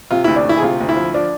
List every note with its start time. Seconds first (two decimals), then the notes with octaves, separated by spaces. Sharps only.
0.11 C3 F4
0.24 D2 E4
0.36 D4
0.45 D2 E4
0.57 G#4
0.62 C3 F4
0.80 D2
0.89 E4
0.96 F3
1.14 F3 D4